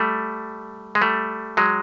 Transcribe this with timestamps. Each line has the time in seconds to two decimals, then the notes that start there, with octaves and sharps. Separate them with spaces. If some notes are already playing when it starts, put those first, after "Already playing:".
Already playing: G3 A3
0.95 G#3
1.02 G3 A3
1.57 F#3 G#3